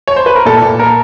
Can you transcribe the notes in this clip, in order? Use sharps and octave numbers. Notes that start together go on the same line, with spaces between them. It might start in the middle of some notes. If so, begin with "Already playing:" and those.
C#5
C5
B4
A#4
A#2 A4
A#2
A#3 A#4